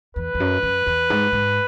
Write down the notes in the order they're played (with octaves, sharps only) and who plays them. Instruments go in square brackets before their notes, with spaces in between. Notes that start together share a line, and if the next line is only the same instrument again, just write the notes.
[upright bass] E2 [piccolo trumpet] B4
[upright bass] E2
F#2
F#2
E2
G#2
G#2